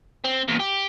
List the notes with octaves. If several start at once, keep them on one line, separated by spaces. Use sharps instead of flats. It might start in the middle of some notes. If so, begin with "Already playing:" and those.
C4
E2 A#2
G4